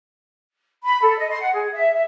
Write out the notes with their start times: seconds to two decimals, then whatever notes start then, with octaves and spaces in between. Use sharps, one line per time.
0.84 B5
1.01 A4
1.17 D#5
1.29 C6
1.40 F#5
1.53 G#4
1.72 E5
1.93 E5